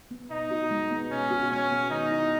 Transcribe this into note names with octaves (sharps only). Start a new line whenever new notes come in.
B3
B2 D#4
F#4
G#3
B3
B2 C#4
F#4
G#3 C#4
B3
D#3 D#4
E4